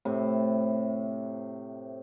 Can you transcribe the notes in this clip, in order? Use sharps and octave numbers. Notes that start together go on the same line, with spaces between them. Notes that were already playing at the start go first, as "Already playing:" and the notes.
A2 C3